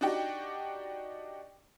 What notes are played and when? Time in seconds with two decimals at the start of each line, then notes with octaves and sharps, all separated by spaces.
0.01 D4 D#4 F#4 G4